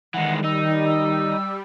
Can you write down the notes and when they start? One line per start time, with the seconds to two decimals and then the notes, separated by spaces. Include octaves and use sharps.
0.14 D#3 E3 G3 G#3 F#5
0.44 D#4 E6
0.86 E6